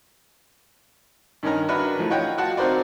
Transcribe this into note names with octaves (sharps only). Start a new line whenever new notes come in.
G2 D#3 C#4 D#4 A#4 A#5
D4 F#4 A#4 B4 E5
E3 F3 A3
F4 C#5 D#5 F#5 G5
F4 F#4 F#5 A5
C4 D#4 F#4 A#4 C5 D5